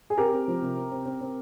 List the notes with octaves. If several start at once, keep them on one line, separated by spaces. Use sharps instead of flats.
G#4
C4 G4 A#4
C4
F3
C3
C4
C4
C4
C4